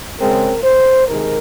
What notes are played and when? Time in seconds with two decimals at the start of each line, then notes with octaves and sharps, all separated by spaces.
0.20 C#3 G#3 C4 A#4
0.64 C5
1.08 C3 D#3 G#3 A#4